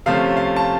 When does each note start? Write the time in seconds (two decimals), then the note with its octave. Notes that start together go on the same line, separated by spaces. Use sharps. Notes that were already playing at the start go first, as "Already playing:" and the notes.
0.06 C3 F3 A3 C#4 F5
0.37 F5
0.56 A5